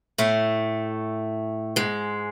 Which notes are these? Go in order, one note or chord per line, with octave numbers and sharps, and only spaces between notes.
A2 A3
G#2 G#3